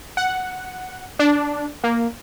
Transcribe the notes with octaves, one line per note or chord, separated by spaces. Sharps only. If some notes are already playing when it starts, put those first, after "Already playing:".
F#5
D4
A#3